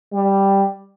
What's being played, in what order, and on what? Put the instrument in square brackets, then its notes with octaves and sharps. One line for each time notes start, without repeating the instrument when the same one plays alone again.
[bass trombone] G3